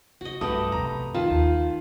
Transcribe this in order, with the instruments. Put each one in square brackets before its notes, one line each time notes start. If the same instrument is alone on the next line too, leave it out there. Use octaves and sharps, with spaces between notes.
[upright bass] C#3 [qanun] F#4 D#5
[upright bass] B1 G2 [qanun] A3 B3 G4 [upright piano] D#6
[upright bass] F2 C3 [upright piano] A#5
[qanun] D#3 A5 [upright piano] F4
[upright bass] D#2